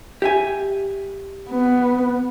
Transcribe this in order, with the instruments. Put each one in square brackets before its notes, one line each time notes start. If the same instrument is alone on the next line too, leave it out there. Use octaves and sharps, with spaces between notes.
[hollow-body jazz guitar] G4 E5 G#5
[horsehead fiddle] B3